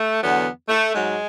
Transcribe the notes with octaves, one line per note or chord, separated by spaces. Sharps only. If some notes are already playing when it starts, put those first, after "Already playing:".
Already playing: A3
E2 D3 F#3 B3
A3
G#2 F#3 G#3